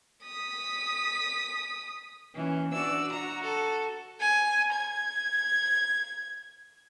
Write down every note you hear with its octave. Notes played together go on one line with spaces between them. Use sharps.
D#6 B6
E3 A#3 C#4
D4 F#4 D5 E6
F#4 A#5
A4
G#5
G#6